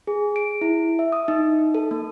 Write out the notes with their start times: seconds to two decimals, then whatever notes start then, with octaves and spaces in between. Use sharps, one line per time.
0.07 G#4
0.36 D7
0.61 E4
0.99 E5
1.12 D#6
1.28 D#4
1.75 A4
1.91 A#3